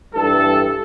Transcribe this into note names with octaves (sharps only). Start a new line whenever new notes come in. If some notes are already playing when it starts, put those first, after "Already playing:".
G2 E3 G3 A4